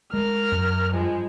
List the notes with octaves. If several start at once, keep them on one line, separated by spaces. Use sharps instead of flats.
G#3 A#4 F6
F#2
G2 F3 G#3